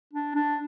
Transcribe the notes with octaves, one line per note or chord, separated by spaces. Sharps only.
D4
D4